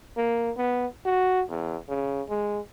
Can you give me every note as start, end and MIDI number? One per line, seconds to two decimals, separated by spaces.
0.17 0.51 58
0.57 0.86 59
1.05 1.43 66
1.50 1.77 40
1.89 2.22 49
2.30 2.60 56